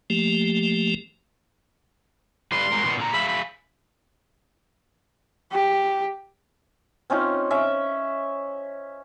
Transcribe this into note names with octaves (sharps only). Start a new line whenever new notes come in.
F3 A3 A#3 G4
G3 F4 B4 C6
F#3 G#3 A#4
A#2 D#3 B3
A#2 D3 A#5
G#4 E5 F5 B5
B5
G4
C4 C#4 D#4 F4
C#4 E5